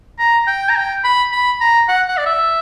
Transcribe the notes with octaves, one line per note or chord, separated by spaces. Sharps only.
A#5
G5
A#5
G5
B5
B5
A#5
F#5
F#5
D5
E5